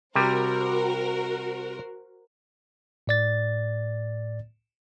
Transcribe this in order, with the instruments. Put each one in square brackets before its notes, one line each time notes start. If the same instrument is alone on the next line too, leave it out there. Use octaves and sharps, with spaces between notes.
[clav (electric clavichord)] C3 G3 [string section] F#4 A#4 C5
[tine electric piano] A2 D5 A6